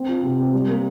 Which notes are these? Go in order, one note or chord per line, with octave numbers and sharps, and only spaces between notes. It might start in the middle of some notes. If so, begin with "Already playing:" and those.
Already playing: C4
F4
C3
C4
G3
A#3